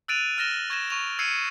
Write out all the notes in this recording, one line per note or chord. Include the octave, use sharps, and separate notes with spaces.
E6 F#6 A6 D7 D#7 F7
F6 F#6 A6 A#6 E7 G7
C#6 G#6 A#6 E7
C#6 F7
E6 G#6 C7 C#7 D#7